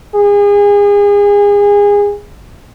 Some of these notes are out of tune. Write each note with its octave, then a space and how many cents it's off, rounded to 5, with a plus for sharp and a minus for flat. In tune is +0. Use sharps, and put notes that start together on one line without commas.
G#4 -30